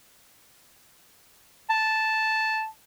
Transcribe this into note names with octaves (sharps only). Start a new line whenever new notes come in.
A5